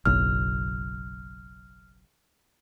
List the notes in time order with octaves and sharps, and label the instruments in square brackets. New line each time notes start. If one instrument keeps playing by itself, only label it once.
[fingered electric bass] F#1 B1 [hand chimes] F6